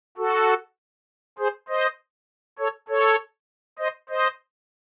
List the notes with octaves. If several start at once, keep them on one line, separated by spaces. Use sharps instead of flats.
F#4 A4
G#4 C5
C5 D#5
A4 C#5
A4 C#5
C5 D#5
C5 D#5